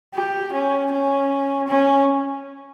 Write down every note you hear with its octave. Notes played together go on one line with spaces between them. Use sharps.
G4
C#4
C#4
C#4